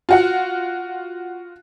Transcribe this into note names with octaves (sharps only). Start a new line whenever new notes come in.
F4 F#4 F#5